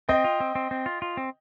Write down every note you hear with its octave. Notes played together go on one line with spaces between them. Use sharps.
C4 D#5 G5
F4
C4
C4
C4
F4
F4
C4